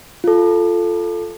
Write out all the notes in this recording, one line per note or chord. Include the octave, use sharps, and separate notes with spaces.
F4 A4